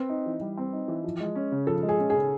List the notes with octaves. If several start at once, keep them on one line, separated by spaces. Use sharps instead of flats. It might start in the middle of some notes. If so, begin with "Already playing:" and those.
Already playing: C4 B4
D#4
E3
G3
C4
D#4
E3
F3
G#3
C#4
C#3
F3 A4
G#3
G#4
C#4
G#4
C#3